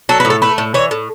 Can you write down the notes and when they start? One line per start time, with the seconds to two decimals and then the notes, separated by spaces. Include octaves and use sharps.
0.09 F#3 A4
0.20 A2 B4
0.30 A4
0.42 A3 B4
0.58 A2
0.74 E3 C#5
0.91 A2